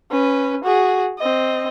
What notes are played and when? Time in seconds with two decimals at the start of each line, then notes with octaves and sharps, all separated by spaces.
0.11 C#4 B4
0.64 F#4 G#4
1.18 C4 D#5